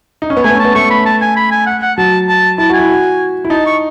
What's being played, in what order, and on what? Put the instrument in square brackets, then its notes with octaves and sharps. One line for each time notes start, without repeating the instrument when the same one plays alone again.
[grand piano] D#4
C#4
B3
[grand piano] A3 [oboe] G#5
[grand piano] B3
C#4
[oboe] A5
[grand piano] B3
[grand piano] A3 [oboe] C#6
[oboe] B5
A5
G#5
B5
G#5
F#5
F#5
[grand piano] F#3 [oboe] A5
[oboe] A5
[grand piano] E4 [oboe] A5
[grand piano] F#4
[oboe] G#5
[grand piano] E4
F#4
E4
[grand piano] D#4 [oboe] A5
[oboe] C#6